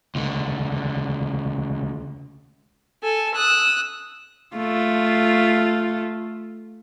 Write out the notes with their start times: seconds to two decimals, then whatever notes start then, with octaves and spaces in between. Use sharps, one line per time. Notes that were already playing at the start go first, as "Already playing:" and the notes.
0.15 C#2 D3
3.02 A4 G#5
3.35 D#6 E6 F#6
4.56 A3 F4